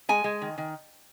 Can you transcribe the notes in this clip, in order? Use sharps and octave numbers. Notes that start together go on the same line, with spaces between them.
G#3 G#5
G#3
D#3
D#3